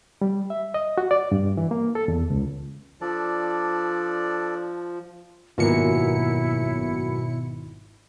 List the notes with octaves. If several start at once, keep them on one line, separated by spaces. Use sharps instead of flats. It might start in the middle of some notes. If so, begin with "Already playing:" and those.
G3
E5
D#5
F#4
D5
G2
E3
A#3
A4
E2
C#2
F3 D4 A4 D5
G#1 F#2 B2 F#3 A#3 E4 F4 C#7